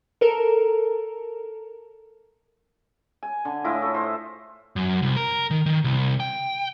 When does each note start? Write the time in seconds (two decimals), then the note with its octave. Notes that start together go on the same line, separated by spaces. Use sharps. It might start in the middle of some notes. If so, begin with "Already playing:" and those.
0.21 A4 A#4
3.23 G#5
3.45 D3
3.64 A2 E4 F4 D#5
3.82 A4 C#5
3.94 C5
4.76 F#2
5.02 C2
5.16 A#4
5.51 D#3
5.66 D#3
5.84 C2
6.20 G5